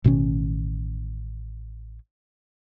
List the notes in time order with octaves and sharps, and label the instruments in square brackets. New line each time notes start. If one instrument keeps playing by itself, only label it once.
[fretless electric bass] A1 B2 D#3 C#4